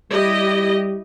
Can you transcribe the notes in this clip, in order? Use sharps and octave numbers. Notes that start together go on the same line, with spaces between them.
G3 E4 G4 D#5